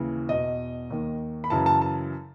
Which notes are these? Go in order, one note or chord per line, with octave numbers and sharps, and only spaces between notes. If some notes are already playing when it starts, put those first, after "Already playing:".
Already playing: D#2 C#3 E3
E2 B2 D#5
D#2 D#3
B5
F#2 C#3 E3 A5
A5
A5